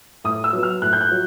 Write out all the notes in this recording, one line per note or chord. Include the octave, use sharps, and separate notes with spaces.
A2 D#6
E6
F#3 B3
F6
A2 F#6
G6
F#6
F#3